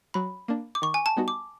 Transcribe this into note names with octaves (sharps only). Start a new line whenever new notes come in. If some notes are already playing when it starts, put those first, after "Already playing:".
F#3 B5
A#3 D4
D6
D#3 C#6
G#5
A5
G3 B3 D#4 F#4
D6